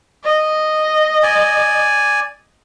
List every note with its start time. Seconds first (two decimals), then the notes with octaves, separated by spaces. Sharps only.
0.24 D#5
1.23 D5 G#5